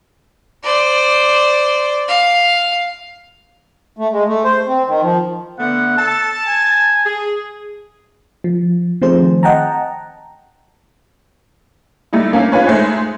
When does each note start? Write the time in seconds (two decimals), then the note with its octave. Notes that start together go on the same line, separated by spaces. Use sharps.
0.64 C5 D5
2.08 F5
3.97 A3
4.12 G#3
4.28 A3
4.44 C5
4.68 C4
4.87 D#3
5.02 F3
5.59 D3 A3 B3 F#5
5.97 A4 A5
6.47 G#5
7.06 G#4
8.44 F3
9.02 D#3 F3 A3 C4 G#4 C5
9.43 D#5 F#5 G5 A5 A#5
12.13 G3 A3 D#4 E4
12.32 A3 A#3 C#4
12.52 C#4 F4 G#4 B4 C#5
12.66 G#3 A3 D#4 G#4 C5